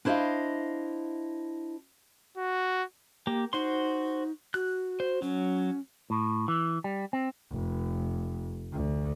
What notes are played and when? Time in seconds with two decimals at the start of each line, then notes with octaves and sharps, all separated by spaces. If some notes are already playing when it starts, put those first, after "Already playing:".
0.05 D4 E4 C5 C#5 D#5 F5
2.37 F#4
3.27 A#3 G4
3.53 D#4 F#4 C5 C6
4.54 F#4 F#6
5.00 C5
5.22 F#3 C#4
6.10 A2
6.48 E3
6.84 G3
7.13 C4
7.51 F1
8.72 D2